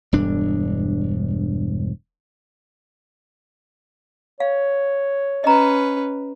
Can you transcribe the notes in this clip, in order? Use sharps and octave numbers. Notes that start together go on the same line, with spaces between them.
E1 G2 D4
C#5 F5
C#4 B4 D#5 A#5